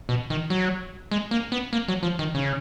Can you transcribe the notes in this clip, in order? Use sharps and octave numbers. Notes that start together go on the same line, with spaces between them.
B2
D#3
F#3
G#3
A#3
B3
A#3
F#3
F3
D#3
C#3